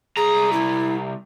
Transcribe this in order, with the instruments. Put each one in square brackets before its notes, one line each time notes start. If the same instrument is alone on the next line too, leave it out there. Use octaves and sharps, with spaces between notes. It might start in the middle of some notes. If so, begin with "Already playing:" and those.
[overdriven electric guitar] C2 A#5 [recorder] G#4
[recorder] E4